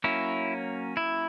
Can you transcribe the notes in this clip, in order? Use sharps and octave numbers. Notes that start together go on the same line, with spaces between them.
F#3 A#3 C#4 E4
E4